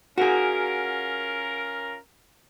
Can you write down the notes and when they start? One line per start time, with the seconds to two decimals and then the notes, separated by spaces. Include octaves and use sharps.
0.18 C#4 F4 F#4 G#4 A#4